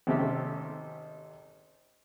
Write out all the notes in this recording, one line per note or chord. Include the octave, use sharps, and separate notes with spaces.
G#1 C3 A3 C#4 G4 E5